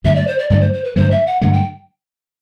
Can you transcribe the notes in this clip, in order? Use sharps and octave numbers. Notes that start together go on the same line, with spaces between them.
G2 D3 F#3 A3 E5
D5
C5
D5
G2 D3 F#3 A3 D5
C5
C5
B4
G2 D3 F#3 A3 C5
E5
F#5
G2 D3 F#3 A3 F#5
G5